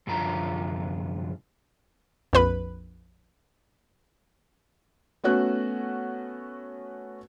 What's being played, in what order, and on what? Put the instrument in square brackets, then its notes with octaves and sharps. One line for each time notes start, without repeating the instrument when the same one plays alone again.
[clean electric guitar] C2 F#2 D3 F3 F4 A#5
[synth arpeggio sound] A#1 F2 B4 B5
[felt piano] A3 B3 C#4 F#4 F#6